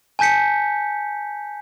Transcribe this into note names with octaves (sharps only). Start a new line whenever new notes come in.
G#5 A5 G6 B6 C#7